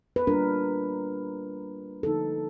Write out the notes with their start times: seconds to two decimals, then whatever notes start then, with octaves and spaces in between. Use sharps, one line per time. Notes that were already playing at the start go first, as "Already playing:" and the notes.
0.16 B4
0.27 G3 A#3 D4 F4 A#4
2.03 D3 F3 A#3 D#4 A4